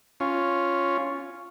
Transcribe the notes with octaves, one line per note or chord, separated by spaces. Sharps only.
C#4 F4